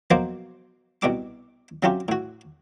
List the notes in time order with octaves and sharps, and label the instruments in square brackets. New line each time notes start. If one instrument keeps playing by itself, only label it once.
[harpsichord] B2 F3 F#3 A#3 C5 D6
C2 B2 G3 D6
C3 F#3 C#4 F4 G4
A2 F#4